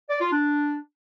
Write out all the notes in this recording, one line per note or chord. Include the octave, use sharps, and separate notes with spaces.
D5
F4
D4